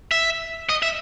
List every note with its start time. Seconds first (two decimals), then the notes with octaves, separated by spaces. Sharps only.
0.11 E5
0.69 D#5
0.82 E5